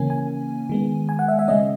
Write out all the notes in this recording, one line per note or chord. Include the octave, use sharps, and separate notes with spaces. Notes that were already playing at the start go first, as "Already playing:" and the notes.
Already playing: C#3 E3 A#3 C#4 G#5
G#5
D#3 G#3 B3
G#5
F#5
E5
E5
C#3 G#3 C#4 D#5